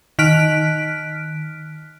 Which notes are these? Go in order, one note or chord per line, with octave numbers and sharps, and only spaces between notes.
D#3 F6 F#6 B6 D7